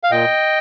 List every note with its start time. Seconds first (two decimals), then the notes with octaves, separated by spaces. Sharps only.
0.03 F5
0.11 A#2 D#5 G5